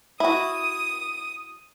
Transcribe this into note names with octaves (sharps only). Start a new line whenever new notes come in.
E4 F#4 D#6